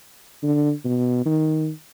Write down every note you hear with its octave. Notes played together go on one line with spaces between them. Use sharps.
D3
B2
D#3